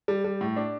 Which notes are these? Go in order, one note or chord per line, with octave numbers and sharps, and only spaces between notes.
G3
G3
A2
D4